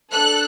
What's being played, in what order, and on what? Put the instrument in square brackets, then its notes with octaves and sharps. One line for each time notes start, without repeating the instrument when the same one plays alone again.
[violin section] D4 A4 F#6